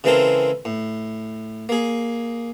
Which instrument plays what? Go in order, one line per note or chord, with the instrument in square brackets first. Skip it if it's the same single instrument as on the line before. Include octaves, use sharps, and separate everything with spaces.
[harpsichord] C#3 E3 G#3 C4 A4 A#4
A2
A#3 G#4